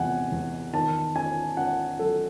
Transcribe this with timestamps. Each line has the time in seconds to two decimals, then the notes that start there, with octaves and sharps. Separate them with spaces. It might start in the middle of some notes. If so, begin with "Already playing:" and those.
Already playing: E2 C3 F#5 G#5
0.32 E2
0.74 D#3 A5
1.15 C#4 G#5
1.57 C#4 F#5
1.99 F#3 A4